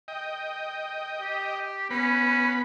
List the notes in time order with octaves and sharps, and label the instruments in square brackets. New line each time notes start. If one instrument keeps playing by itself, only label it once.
[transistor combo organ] D#5 G5
[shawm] G4
[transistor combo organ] B3 B5 [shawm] C#4